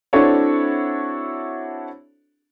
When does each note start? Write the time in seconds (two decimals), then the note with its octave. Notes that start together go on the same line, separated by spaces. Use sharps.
0.13 C4 D4 E4 F#4 A4 C#5